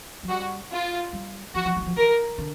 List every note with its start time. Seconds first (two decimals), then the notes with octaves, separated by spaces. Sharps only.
0.23 F#3
0.29 G3 F#4
0.72 F4
1.13 G3
1.54 F3 F#4
1.65 F3
1.76 F#3
1.81 E3
1.86 F3
1.97 E3 A#4
2.38 D3